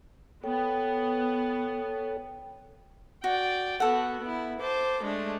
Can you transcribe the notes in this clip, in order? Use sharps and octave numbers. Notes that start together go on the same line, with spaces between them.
B3 A4 C#5 G5
F#4 D5 G5
B3 F#4 A4 F#5
B3 E4
C5 A5 D6
G#3 A3 D4